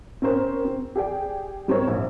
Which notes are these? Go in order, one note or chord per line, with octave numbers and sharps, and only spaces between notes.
C4 C#4 A#4 C5
C4
G4 G#4 D5 G5
G3 C4 A#4 C#5
A#1